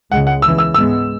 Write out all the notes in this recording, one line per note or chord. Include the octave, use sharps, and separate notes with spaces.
C#2 C#3 G#3 F#5
F#5
E2 C#3 E3 E6
E6
G#2 G#3 B3 E6